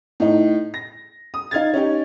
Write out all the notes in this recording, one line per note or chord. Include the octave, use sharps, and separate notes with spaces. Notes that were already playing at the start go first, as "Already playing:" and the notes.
A2 D#4
A#6
D#6
D#4 F5 G#6 A6
C#4 D#4 G4